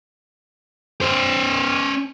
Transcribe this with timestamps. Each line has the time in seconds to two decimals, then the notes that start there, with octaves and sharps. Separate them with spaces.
1.01 C#4 C5